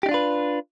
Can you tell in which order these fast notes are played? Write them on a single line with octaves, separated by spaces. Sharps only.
G4 D#4 D4 F4 B4